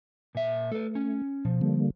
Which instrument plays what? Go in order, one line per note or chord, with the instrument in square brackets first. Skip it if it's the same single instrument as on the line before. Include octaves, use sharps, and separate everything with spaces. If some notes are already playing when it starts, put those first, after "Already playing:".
[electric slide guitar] A#2 E5
[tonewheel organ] A3 [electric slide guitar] A4 B4
[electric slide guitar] C#4
[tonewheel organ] B2 [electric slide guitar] F3
[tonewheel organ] D3 G3 A#3